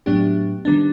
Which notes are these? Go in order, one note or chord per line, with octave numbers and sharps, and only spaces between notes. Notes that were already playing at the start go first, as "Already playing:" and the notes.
A2 F#3 B3 D4 G4
D#3 G3 B3 D4